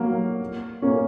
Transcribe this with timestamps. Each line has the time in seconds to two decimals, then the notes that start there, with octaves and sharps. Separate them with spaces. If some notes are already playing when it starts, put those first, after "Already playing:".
Already playing: F#3 A#3
0.82 A#3 C#4